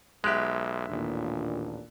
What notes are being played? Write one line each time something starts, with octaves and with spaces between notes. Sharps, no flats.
B1 G#3 G4 E5 F#6
A1 D#2 A#2 D4